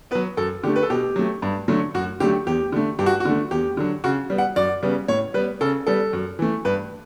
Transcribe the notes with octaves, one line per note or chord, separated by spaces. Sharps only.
F#3 B3 B4
F#2 A4
D3 A3 G4
B4
A4
B2 G4
F#3 A3
G2
D3 F#3 A3
F#2 F#4
D3 F#3 A3 G4
E2 G4
D3 A3
G2 G4
F#4
F#4
D3 A3
E2 G4
D3 F#3
C#3 F#4
G3 B3
F#5
F#2 D5
C#3 G3 B3
A2 C#5
G3 B3 B4
C#3 A4
G3 B3 A4
F#2
E3 A3
G2 B4